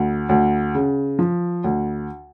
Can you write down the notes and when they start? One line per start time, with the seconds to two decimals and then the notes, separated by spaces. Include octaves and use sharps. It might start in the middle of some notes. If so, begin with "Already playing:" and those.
Already playing: D2
0.29 D2
0.75 C#3
1.19 F3
1.64 D2